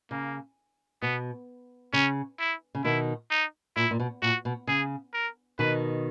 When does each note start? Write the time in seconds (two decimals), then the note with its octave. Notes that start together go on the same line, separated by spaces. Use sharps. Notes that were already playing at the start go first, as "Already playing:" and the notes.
0.11 C#3 A#3
1.02 B2 B3
1.93 C#3 C#4
2.39 E4
2.75 C#3
2.85 B2 D#3 E4
3.31 D#4
3.76 A#2 E4
3.91 A#2
3.99 B2
4.22 A#2 F#4
4.45 B2
4.67 C#3 G#4
5.14 A#4
5.59 B2 D#3 B4